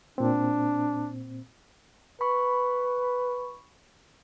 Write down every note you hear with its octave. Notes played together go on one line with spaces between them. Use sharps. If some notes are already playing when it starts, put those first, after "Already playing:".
A#2 C4 D4
B4 B5 C#6